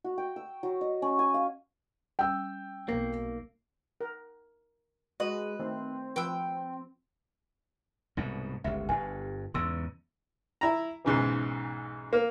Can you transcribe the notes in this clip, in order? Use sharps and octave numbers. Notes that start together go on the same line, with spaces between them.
F#4
G5
E6
F#3
D#5
C#4
G#5
F5
G3 C#4 G5 E6
B1 A#3
A#4
G#3 F#4 B4 D#5
D#3 A3 C4
F3 B4 G5 E6
C2 G#2 B2
G1 C#2 E5
G1 G2 G#5
E2 G#2 C#3 C6 E6
E4 A#5
B1 G#2 C#3 E3
A#3